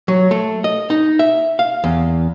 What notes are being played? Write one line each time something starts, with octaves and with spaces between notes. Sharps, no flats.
F#3
A3
D#5
D#4
E5
F5
E2